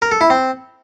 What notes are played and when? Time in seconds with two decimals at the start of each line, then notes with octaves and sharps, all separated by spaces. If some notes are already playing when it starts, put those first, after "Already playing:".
0.02 A#4
0.11 A4
0.21 E4
0.30 C4